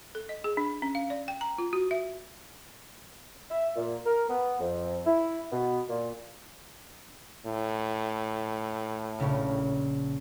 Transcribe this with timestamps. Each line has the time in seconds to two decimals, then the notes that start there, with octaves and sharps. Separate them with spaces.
0.15 A4
0.29 D#5
0.44 G#4
0.57 D4
0.82 C#4
0.95 F5
1.10 D5
1.28 G5
1.41 A#5
1.58 F4
1.73 F#4
1.91 E5
3.50 E5
3.76 A#2
4.05 A#4
4.29 B3
4.60 F2
5.06 E4
5.52 B2
5.89 A#2
7.46 A2
9.20 A#1 C#3